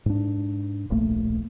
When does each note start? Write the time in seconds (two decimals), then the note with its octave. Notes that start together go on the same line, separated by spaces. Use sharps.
0.06 G#2 D4
0.90 D1 A#1 A3 A#3